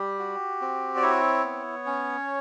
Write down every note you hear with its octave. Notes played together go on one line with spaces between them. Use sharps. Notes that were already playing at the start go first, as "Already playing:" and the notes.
Already playing: G3 G4
F#4
C4
D5
E4 C#5
B3
C#4